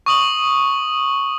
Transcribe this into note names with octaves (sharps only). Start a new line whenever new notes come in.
C#6 D#6 F#7